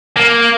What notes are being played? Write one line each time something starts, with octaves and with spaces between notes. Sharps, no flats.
A#3